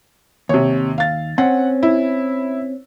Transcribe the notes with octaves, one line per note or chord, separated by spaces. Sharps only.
D#2 C3 C#5
F5 A6
C4 C#4 F#5
E4